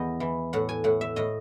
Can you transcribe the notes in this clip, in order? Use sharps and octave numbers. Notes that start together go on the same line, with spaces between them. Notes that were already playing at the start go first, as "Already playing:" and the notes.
Already playing: E2 D#5
E3
A2 F#5
G#5
A2 F#5
E5
A2 D#5